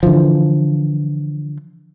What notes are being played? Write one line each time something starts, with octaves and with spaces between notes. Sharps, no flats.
D3 E3 F3